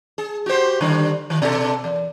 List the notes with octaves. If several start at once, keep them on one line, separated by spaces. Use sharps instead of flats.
G#4
F#4 G4 C5
D3 D#3 G3
D#3
B2 A4
E2